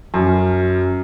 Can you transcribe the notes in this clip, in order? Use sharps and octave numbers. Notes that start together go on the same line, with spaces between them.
F#2